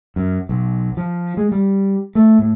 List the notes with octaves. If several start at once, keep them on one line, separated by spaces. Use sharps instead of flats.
F#2
B1
F3
G#3
G3
A3
A2